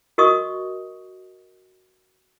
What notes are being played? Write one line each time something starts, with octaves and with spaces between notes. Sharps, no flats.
F#4 A#4 D#5 C#6 D#6